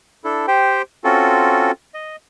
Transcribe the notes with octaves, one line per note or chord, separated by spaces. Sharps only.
D4 E4 A4
G4 C5 G5
C4 C#4 F4 F#4 A4
D#5